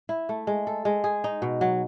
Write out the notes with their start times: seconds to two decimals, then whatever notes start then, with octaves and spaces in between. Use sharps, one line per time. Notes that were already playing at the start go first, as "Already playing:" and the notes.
0.09 E4
0.29 A3
0.47 G#3
0.67 A4
0.85 G#3
1.04 G#4
1.24 D#4
1.42 B2
1.61 F#3